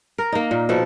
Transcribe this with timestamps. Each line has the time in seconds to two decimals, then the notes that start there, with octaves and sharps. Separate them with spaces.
0.18 A#4
0.32 A#3 D#4
0.51 A#2
0.69 B2 F3 A4